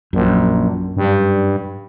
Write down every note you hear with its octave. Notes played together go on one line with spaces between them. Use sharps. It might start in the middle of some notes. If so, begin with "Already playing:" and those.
A#1 F#2
G2